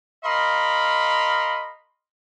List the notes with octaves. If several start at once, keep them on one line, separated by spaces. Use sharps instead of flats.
A#4 D#5 F5 B5 C6